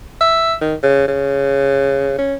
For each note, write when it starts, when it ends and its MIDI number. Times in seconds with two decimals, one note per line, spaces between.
0.21 0.54 76
0.61 0.75 51
0.83 1.07 49
1.08 2.14 49
2.18 2.35 61